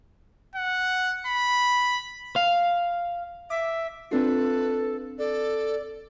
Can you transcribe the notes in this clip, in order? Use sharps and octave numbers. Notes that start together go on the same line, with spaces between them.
F#5
B5
F5
E5 D6
C4 D4 F4 A4 B4
A4 D5